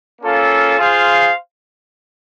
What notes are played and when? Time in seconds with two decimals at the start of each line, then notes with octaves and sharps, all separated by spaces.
0.22 A#3 C#4 F4 A4
0.77 F4 G#4 C5 F5